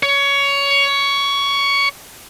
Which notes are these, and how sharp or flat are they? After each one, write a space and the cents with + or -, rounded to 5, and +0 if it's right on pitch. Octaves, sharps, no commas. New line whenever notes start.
C#5 +15